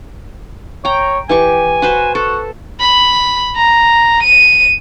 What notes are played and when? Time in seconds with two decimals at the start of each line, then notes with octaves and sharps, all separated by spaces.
0.85 C#5 G5 A#5
1.29 E3 G4 G#5 C#6
1.82 F#4 B4 C5
2.15 F#4 A4
2.80 B5
3.55 A#5
4.23 D#7